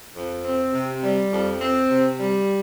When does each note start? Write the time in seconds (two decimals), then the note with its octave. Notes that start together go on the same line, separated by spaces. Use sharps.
0.16 F2
0.45 C4
0.73 C3
1.02 G3
1.32 F2
1.61 C4
1.89 C3
2.19 G3